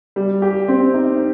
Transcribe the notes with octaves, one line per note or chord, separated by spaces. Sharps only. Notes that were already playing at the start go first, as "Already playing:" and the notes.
G3
G4
C4
D#4